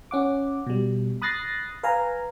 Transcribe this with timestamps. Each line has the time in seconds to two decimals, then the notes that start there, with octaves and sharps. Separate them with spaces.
0.11 C#4 F#5 D6
0.67 B2 G3
1.22 B5 D#6 F#6 A6 A#6 C7
1.83 B4 F5 G#5 A#5